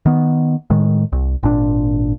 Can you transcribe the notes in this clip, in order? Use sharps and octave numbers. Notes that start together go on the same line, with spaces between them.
D#3 B3
A2 D#3 G#3
C2
G#1 A#2 D4